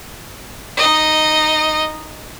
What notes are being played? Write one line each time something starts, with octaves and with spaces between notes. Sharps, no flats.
D#4 D#5